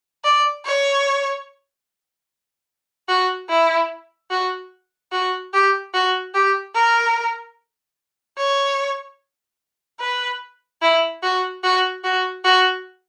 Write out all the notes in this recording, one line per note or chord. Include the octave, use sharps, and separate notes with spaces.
D5
C#5
F#4
E4
F#4
F#4
G4
F#4
G4
A#4
C#5
B4
E4
F#4
F#4
F#4
F#4